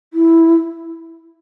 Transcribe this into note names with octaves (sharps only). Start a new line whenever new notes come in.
E4